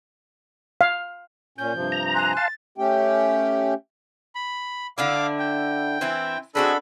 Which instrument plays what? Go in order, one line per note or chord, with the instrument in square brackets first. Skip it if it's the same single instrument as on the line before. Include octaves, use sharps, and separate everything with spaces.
[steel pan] F5
[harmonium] A#2 C#4 [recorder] G6
[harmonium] G2 C3 F3
[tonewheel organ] A#5
[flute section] G#5 C6 F#6
[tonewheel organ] F5 A5 [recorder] A6
[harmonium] A3 C#4 G4 G5
[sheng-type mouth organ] B5
[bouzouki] D3 D4 E4 [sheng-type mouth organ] F5 D6
[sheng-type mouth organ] G5
[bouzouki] E3 C4 E4
[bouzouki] G#3 C4 F#4 [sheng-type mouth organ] D4 A4 B5